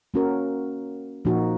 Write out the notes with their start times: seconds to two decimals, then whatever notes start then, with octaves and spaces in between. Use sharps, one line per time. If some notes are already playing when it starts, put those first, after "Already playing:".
0.14 A#3 C#4 F#4 A#4
1.25 A#2 F3 A#3 D#4 F#4